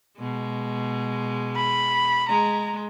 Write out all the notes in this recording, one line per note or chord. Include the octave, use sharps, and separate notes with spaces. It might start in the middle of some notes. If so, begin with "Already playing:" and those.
B2 G#3
B5
G#3 A#5